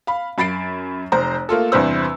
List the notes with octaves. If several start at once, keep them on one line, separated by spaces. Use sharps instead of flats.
F5 B5
F#2 B5 A6 C7 D7
F1 C5 A#5
A3 A#3 F4 A4
E2 G2 C3 B4 C5 E6